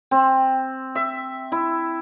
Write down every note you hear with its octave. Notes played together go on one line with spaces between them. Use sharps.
C4
E5
E4